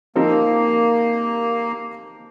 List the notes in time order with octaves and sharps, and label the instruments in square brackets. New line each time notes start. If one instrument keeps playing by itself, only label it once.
[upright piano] F3 C4 D#4 G4 A#4 [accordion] A#3